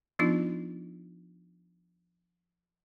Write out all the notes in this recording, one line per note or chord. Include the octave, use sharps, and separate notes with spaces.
F3 B3 D4 D#4 F4